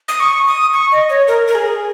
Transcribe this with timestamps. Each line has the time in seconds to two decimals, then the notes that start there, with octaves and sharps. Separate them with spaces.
0.08 D#6
0.20 C#6
0.48 D#6
0.74 C#6
0.92 D#5
1.10 C#5
1.28 A#4
1.47 A#4
1.55 G#4